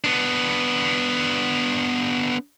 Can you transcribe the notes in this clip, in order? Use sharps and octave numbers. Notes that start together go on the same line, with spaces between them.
B3 D4